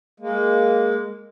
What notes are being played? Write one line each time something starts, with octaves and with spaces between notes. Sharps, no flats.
G#3 A#3